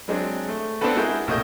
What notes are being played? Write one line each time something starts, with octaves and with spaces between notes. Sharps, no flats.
F#3 G#3 C4 D4
A3
B3 C4 D4 F4 A4 B4
G#3 E4 F#4 G#4 A#4 G6
A#1 A2 C3 A#3 D#5 G6